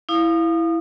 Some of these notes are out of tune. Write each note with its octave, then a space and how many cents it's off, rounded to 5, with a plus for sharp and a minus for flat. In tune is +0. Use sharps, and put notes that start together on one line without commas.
E4 +0 F5 +0 D#6 -30